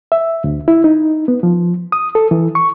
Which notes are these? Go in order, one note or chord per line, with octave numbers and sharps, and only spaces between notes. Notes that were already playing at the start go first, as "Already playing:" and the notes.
E5
D2
E4
D#4
B3
F3
D#6
A4
E3
C#6